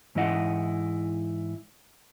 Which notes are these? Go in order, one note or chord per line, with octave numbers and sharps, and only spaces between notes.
G#2 E3 E4 D#5 F#5